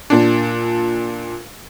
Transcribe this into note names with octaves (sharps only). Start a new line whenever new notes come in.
A#2 D4